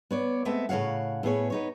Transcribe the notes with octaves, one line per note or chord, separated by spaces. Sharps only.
B3 C#5 D5
G#3 A3 B3 C4 E5
A2 C#3 C#5 F5 F#5
A2 B3 G#4 C#5
B3 D#4 C#5